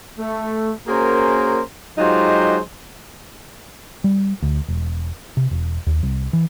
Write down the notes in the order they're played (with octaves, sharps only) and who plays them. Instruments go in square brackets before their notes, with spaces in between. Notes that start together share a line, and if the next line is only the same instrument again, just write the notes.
[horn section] A3
A#3 C#4 F#4 G#4 A#4 C5
F#3 G#3 D#4 F4 G4 C5
[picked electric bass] G3
D2
E1
C3
E1
D#2
C2
E3